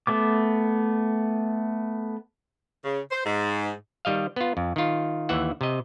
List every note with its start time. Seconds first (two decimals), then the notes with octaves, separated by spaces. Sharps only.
0.07 A3 B3 D6
2.84 C#3
3.11 C5
3.24 G#2
4.05 D#3 G3 D#5 F5
4.36 B3 F4
4.57 F2
4.76 D#3 F4
5.29 D#2 E3 E5 F#5
5.61 C3 D#5